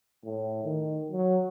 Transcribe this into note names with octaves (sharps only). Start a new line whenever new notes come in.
A2
D#3
F#3